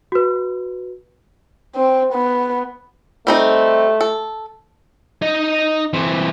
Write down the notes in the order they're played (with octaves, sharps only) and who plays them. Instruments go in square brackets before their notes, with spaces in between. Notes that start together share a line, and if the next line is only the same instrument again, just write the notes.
[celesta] F#4 B4
[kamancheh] C4
B3
[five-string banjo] G3 C4 D#4 [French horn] A3
[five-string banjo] A4
[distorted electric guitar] D#4 D#5
E3 C4